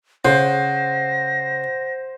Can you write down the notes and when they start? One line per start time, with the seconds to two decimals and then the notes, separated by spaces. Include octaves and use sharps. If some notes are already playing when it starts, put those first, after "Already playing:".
0.25 C#3 C5 F#5 A#6